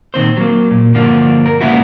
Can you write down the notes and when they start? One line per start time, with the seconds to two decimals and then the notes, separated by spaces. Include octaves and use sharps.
0.14 A#2 D#3 C4 C5
0.37 F#3 A#3
0.71 A#2
0.95 G2 D3 F3 A#3 D4
1.46 A#4
1.61 G#2 C#3 A#3 B3 E4 F#4